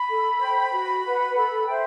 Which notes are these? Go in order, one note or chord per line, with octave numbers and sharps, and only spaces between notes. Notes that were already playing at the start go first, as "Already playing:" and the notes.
Already playing: B5
A4
C5 G5
F#4
B4 F#5
A4 B5
C5 E5 G5